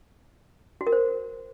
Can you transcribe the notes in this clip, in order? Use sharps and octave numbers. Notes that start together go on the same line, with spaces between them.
F#4
A#4
C5